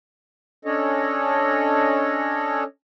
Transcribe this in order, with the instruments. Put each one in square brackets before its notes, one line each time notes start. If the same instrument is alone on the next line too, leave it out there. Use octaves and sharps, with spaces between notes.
[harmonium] C#4 D4 A4 C#5 D#5